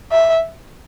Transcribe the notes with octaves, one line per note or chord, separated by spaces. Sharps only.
E5